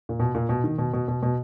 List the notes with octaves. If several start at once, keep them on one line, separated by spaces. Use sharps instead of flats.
A#2
B2
A#2
B2
D#3
B2
B2
B2
B2